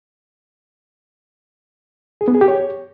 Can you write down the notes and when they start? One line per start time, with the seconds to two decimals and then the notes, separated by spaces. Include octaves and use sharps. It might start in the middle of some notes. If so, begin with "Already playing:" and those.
2.21 G#4
2.28 B3
2.34 G#4
2.41 G4
2.48 C#5